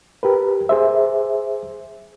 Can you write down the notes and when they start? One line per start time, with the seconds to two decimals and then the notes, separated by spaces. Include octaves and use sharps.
0.23 G4 A#4 B4
0.69 G#4 C5 E5